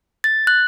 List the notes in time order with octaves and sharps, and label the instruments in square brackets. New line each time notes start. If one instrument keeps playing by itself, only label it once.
[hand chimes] A6
F#6